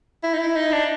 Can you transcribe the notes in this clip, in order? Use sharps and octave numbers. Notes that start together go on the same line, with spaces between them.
E4
D#4
E4
D#4
D4